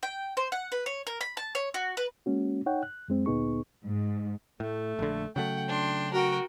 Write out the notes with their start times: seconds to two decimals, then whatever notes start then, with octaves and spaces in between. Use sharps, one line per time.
0.03 G5
0.37 C5
0.52 F#5
0.72 B4
0.86 C#5
1.07 A#4
1.21 B5
1.37 A5
1.55 C#5
1.74 F#4
1.97 B4
2.26 G#3 A#3 C#4 F#4
2.66 D#4 C#5 F#5 G5
2.83 F#6
3.08 F#2 G#3 C4
3.26 D2 A#2 B3 D#4 G#4 C#6
3.84 G#2
4.60 A2 A3
4.99 A#1 D3
5.36 C#3 F#3 A3 F#5 G5
5.68 D4 C6
6.13 F#4 A#4 F#5 G5